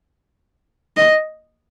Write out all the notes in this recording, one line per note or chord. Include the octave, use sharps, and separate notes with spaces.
D#5